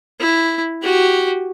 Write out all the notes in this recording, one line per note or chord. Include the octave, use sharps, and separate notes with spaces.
E4
F#4 G4